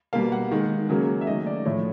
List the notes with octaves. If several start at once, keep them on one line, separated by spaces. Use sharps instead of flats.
B2 G3 A#3 F5
F#5
D#3 G#3
C#3 F#3 A#3
E5
D#3 F#3 A3 D#5
D5
A2 F3 A3 C#5